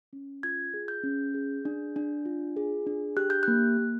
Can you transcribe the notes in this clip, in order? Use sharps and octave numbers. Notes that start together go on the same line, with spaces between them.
C#4
F4 G#6
G#4
G6
C#4
G#4
D4
D4
F4
G#4
D4
G4 F#6
G6
A#3 F#6
A#3